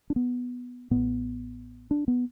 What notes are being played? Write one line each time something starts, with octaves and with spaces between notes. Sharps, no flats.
D4
B3
A1 A2 B3
D4
B3